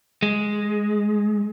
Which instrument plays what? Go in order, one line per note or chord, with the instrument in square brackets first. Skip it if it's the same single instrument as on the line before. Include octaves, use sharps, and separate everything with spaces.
[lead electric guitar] G#3